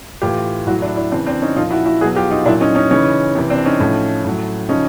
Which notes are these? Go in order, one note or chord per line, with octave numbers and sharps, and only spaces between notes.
A2 E3 F4 G4
A2 F#3 E4 F#4
D4 E4
D4 E4
C#3 E3 C4 D4
C4 D4
C#4 D#4
A#2 F3 D#4 F4
E4 F#4
E4 F#4
B2 F#3 F#4 G#4
F4 G4
D#4 F4
A#2 F#3 D4 E4
C#4 D#4
C#4 D#4
C#3 E3 C#4 D#4
C3 E3
C4 D4
C#4 D#4
A2 F3
A2 F#3
C#3 F3 C#4 D#4